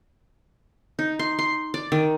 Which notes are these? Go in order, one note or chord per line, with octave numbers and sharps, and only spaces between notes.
D#4
C6
C6
D5
D#3